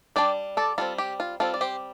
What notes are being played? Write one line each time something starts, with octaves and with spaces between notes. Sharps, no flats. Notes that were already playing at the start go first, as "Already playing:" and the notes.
G3 D4 D5 G5
A4 D5
G3 C4 F4 A4
G4
F4
G3 C4 F4 A4
D5
G4 C5